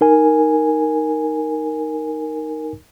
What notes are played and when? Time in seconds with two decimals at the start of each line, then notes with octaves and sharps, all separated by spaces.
0.01 D#4 A#4 G#5